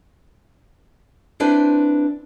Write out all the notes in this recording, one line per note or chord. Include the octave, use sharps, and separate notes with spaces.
C4 D4 E4 B4 C5